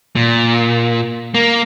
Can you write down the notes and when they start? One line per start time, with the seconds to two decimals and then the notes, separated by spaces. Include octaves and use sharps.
0.16 A#2
1.34 A#3